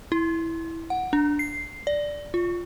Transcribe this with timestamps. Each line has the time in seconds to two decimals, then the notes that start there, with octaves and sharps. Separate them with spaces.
0.12 E4
0.90 F#5
1.13 D4
1.39 C7
1.87 D5
2.34 F4